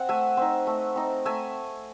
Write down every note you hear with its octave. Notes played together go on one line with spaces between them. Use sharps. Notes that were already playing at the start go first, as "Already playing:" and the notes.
Already playing: C4 F#5
A3 E5 G#5
C4 D#4
A3
C4 D#4
A3 E5 G#5